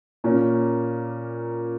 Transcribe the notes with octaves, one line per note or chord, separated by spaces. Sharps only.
A#2 A#3 C#4